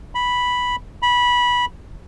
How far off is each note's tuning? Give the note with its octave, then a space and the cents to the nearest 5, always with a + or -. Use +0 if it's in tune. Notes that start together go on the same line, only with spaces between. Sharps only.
B5 -5
B5 -15